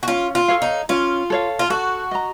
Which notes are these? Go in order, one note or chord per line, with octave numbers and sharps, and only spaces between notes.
F#4
C#4 F4
F4
A4 C#5 F5
D#4
C#4 F4
A4 C#5 F5
F4
F#4 A4
D#5 A#5